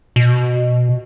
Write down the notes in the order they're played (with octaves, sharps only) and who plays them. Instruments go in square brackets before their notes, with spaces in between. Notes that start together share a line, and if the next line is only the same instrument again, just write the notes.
[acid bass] B2